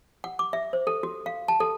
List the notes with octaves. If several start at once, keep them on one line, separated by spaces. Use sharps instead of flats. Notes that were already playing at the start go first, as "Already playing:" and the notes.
F#5
D6
E5
C5
A4
F#4
F5
A5
A4